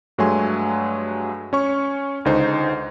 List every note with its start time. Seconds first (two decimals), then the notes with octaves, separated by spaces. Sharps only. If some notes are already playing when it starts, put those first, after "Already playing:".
0.18 G2 F#3 G#3 A3 G#5 C6
1.53 C#4 C#5 C#6
2.25 C#2 D3 D#4 C5